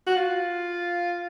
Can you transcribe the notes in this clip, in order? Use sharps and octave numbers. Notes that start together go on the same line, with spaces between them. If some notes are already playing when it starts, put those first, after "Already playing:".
F#4
F4